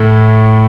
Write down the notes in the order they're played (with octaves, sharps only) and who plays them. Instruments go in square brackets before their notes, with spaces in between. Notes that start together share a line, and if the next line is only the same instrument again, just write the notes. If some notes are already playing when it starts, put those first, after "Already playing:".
Already playing: [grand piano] A2 A3